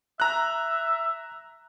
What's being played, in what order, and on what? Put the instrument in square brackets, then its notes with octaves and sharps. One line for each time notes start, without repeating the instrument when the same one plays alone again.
[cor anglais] E5 [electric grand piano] A#5 F#6